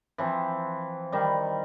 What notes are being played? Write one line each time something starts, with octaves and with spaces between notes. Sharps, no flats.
E3 F3 C4
D#3 G3